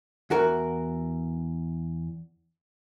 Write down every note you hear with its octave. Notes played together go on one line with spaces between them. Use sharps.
E2 F#4 A#4